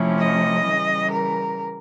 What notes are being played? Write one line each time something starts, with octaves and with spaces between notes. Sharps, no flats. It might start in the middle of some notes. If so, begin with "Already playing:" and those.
Already playing: C3 F3 A3 C#4 E4
D#5
C#3 E3 G3
A#4